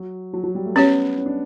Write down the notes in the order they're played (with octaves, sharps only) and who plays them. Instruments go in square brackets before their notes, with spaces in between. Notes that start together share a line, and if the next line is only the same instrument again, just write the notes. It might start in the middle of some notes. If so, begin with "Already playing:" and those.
Already playing: [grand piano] F#3
F#3
F#3
G3
A3
[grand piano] B3 [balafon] C#4 G4 C#5
[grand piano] C#4
D4